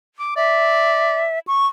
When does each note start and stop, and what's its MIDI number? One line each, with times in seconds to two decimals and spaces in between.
0.19 0.34 86
0.36 1.25 74
0.36 1.39 76
1.47 1.67 85